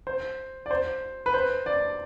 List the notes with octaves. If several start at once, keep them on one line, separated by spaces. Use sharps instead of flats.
C5
D5
C5
B4
C5
D5